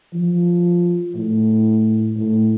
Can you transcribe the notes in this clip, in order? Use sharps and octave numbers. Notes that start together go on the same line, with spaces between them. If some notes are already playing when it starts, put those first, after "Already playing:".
F3
A2
A2